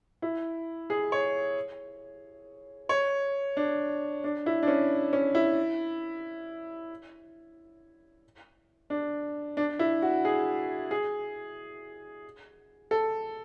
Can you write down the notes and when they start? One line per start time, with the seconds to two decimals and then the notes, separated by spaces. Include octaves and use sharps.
0.22 E4
0.90 G#4
1.12 C#5
2.89 C#5
3.57 D4
4.24 D4
4.46 E4
4.62 D4
4.68 C#4
5.13 C#4
5.35 E4
8.90 D4
9.57 D4
9.79 E4
10.02 F#4
10.25 G#4
10.91 G#4
12.91 A4